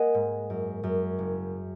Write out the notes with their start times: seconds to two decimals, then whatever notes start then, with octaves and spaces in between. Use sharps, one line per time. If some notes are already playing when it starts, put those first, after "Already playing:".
Already playing: A#3 D#5 F#5 G#5
0.14 G#2
0.50 F#2
0.84 F#2
1.19 F#1